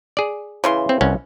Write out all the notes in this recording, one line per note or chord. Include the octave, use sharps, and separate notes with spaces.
G#4 D5
C#3 E3 C6
C4
C2 C#4 F#5